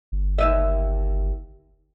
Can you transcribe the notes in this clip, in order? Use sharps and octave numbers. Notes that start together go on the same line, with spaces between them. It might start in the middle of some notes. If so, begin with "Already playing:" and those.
G1
D#2 D#5 E5